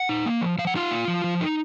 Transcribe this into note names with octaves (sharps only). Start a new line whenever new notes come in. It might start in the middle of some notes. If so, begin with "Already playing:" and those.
Already playing: F#5
D#4
A#3
F3
F3 F5
F#5
D#4 F4 F5
A#3
F3
F3
D#4